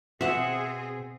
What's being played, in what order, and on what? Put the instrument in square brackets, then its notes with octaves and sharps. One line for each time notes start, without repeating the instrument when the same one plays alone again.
[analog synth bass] B2 [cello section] C4 G#4 [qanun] E5 F#5